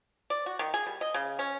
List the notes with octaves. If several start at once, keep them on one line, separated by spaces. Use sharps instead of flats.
D5
F#4
D#3
G#4
G3
D#5
C#3
C#4